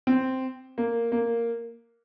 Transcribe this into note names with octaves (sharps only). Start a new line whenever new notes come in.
C4
A#3
A#3